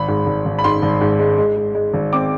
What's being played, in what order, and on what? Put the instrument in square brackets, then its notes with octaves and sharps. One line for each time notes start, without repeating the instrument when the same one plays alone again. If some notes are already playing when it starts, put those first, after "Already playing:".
Already playing: [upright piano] G#1 B5
G#2
G#1
G#1
B5
G#2 C6
G#1
G#2
G#3
G#3
G#3
G#3
G#1
C4 D6